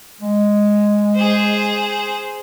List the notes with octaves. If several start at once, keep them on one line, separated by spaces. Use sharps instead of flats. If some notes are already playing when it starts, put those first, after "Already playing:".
G#3
G#4 C5